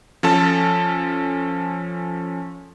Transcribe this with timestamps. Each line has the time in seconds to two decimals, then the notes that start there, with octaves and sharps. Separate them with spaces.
0.23 F3 C#4 A4 A5